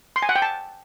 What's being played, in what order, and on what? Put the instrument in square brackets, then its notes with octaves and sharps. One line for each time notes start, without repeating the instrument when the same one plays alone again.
[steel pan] C6
G#5
F#5
G5
A5